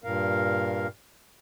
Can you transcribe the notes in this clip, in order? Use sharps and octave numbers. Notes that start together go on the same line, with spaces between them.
G2 A#2 A#4 F5